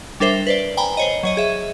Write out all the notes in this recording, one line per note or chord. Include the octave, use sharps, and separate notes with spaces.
G3 D4 A#4 C5 E5
B4 C5 D5
G5 G#5 A#5 B5
C5 C#5 D#5
F#3 C#5 D#5
G#4 E5